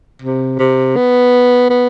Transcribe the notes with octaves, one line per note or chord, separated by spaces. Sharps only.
C3
C3
B3
B3